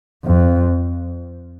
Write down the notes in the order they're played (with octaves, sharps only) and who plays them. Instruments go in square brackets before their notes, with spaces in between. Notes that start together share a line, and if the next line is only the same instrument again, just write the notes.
[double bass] F2